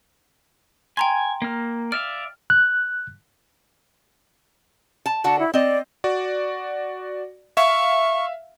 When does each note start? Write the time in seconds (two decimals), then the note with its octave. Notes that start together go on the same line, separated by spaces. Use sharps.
0.97 G5 G#5 A#5 C6
1.42 A#3 F6
1.92 D5 E5 F5 F6
2.50 F#6
5.06 A5
5.24 D3 F#4 F#5 A5
5.39 E4
5.54 C4 D5 D#5
6.04 F#4 D5
7.57 E5 F5 C#6